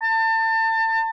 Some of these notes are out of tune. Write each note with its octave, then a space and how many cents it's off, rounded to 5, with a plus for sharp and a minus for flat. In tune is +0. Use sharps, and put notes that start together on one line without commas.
A5 +30